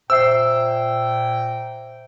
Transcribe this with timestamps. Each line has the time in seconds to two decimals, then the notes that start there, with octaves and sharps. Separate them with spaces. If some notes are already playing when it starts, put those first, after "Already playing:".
0.10 A#2 C5 E5 G5 E6 C7